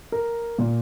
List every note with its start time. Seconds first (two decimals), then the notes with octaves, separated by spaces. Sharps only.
0.12 A#4
0.58 A#2